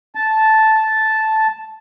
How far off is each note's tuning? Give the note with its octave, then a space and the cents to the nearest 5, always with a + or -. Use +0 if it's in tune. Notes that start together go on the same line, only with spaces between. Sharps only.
A5 -5